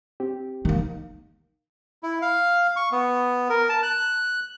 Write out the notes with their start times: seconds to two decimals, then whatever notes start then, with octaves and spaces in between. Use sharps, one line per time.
0.20 C4 G4
0.65 D#3 A#3
2.03 E4
2.22 F5
2.76 C#6
2.92 B3
3.50 A#4
3.69 A5
3.83 F#6